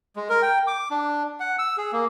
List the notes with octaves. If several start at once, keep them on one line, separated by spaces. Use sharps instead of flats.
G#3
A#4
G5
D6
D4
F#5
E6
G#4
A#3